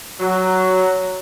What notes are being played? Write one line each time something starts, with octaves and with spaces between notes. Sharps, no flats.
F#3